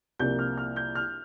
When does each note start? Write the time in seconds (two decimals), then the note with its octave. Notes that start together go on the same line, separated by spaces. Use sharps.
0.19 C2 C3 F3 A#3 G6
0.39 F6
0.57 F6
0.76 G6
0.95 F6